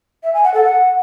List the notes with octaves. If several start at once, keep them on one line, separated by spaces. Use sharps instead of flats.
E5
G#5
F#5
A4
F#5